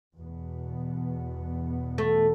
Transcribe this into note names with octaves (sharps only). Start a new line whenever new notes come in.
E2 B2 B3
A3